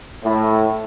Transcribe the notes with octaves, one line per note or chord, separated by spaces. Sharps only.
A2